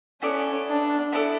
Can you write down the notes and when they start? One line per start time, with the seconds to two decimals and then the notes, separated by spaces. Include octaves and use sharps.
0.22 B3 C#4 E4 A4 D5
0.68 D4
1.12 B3 E4 A4 D5